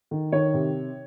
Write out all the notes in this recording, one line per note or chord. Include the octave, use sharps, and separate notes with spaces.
D#3
D#3 C#5
C3